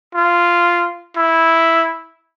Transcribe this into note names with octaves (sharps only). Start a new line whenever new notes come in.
F4
E4